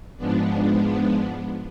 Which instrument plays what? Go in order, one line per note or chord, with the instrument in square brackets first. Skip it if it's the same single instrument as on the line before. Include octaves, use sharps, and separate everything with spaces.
[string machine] G#2 F3 G#3 B3 D4